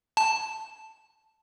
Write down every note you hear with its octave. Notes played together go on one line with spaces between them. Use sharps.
A5